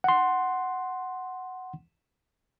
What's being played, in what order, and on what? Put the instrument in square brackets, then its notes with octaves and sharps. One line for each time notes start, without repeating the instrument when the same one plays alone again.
[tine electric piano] F#5 C6